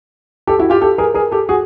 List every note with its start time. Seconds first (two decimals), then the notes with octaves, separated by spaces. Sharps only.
0.47 G4 A4
0.59 E4 F#4
0.70 F4 G4
0.81 G4 A4
0.98 G#4 A#4
1.14 G#4 A#4
1.31 G4 A4
1.49 F#4 G#4